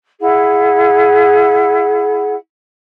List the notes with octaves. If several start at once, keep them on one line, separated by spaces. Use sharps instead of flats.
E4 G#4 F#5